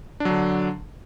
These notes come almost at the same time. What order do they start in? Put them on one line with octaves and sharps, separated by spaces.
D4 F#3 D3